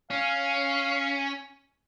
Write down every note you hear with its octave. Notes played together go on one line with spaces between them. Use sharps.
C#4 F5